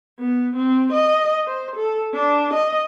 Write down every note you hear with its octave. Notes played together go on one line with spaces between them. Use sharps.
B3
C4
D#5
C5
A4
D4
D#5